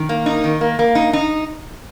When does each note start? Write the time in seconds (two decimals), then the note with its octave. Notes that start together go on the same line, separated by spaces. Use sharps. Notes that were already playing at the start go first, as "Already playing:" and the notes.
Already playing: D#3
0.09 A#3
0.26 D#4
0.44 D#3
0.61 A#3
0.79 A#3
0.95 D#4
1.13 D#4